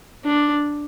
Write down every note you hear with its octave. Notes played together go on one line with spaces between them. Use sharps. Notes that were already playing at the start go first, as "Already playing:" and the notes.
D4